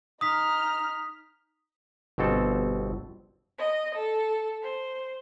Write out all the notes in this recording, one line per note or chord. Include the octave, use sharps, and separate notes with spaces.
D#4 D#6 F6 B6
G1 B2 C4 A4
D#5
A4
C5